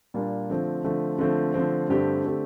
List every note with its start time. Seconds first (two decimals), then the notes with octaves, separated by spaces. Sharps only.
0.14 A#2 G3 A#3 D4 F4
0.50 D3 F3 A3 C4
0.84 D3 F3 A3 C4
1.19 D3 F3 A3 C4
1.54 D3 F3 A3 C4
1.89 G2 D3 A3 C4 G4
2.25 D3 A3 C4 G4